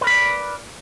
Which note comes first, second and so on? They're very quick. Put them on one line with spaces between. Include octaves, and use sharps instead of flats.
B4 A#4 B5 D5